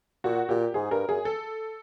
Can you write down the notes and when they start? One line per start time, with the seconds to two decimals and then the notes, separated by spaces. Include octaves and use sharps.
0.24 A#2 F#4
0.49 A#2 G4
0.74 G#2 G#4
0.91 G2 A#4
1.08 F#2 G#4
1.25 A4